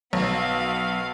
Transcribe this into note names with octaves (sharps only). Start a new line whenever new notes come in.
B1 B3 F5